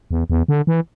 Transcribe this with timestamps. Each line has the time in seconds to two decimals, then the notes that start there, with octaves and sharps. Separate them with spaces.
0.11 E2
0.30 E2
0.48 D3
0.67 E3